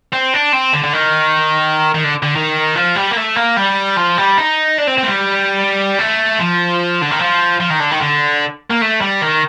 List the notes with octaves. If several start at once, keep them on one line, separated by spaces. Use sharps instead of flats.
C4
D4
C4
D3
D3
D#3
D#3
D3
D3
D#3
F3
G3
A#3
A3
A#3
G3
F3
G3
D#4
D4
C4
A3 C4
G3
A3
F3
D3
D#3
F3
F3
D#3
D3
D#3
D3
A#3
A3
G3
D#3